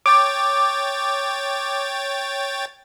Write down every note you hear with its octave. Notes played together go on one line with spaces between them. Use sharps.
C#5 G5 D6 A6